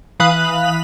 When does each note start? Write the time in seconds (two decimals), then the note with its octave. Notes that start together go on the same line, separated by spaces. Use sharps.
0.20 E3 F5 B5 D#6 F#6 F#7